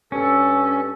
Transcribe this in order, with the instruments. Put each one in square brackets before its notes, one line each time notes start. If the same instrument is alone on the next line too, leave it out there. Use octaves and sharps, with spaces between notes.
[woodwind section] G2 A4 [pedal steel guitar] C#4